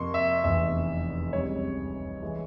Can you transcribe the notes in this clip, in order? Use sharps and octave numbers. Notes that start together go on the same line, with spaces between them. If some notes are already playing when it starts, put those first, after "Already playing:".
Already playing: F2 C3 F3 A#3 C6 C#6
E5
F1 E2 E3 E5
C#2 C3 G3 C#5
E3 G#3